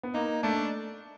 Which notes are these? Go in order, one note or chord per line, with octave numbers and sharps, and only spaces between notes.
B3
A#3 D#4
A3 D4